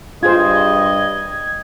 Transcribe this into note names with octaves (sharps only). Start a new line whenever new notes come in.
G2 F4 G#4 C5 D#5 G#6